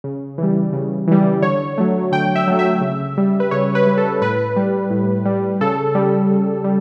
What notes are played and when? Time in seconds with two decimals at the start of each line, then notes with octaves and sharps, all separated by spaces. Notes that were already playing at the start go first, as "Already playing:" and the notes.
0.04 C#3
0.38 E3 G3
0.73 C#3
1.08 E3 G3
1.42 D3 C#5
1.78 F#3 A3
2.12 D3 G5
2.36 E5
2.47 F#3 A3
2.59 E5
2.81 C#3
3.17 G3
3.40 B4
3.51 C#3 C#5
3.75 B4
3.86 G3
3.98 A4
4.21 A2 B4
4.56 G3
4.90 A2
5.25 G3
5.61 C#3 A4
5.95 G3
6.30 C#3
6.64 G3